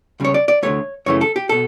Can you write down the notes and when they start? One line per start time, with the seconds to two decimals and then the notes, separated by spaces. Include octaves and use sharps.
0.20 C#2 C#3 G3 C#5
0.34 D5
0.48 D5
0.63 D2 D3 F#3 A3 C#5
1.06 F#2 C#3 E3 A3 C#5
1.21 A4
1.36 G4
1.49 B2 A4